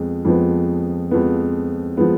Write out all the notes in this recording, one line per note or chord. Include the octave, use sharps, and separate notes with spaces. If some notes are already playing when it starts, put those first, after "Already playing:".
Already playing: F2 F3 G#3 B3
F2 F3 G#3 B3
F2 F3 G#3 B3
F3 G#3 B3